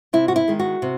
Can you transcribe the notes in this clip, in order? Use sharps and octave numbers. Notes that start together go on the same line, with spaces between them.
C3 E4
F#4
E4
D#3 G#3
F#4
C3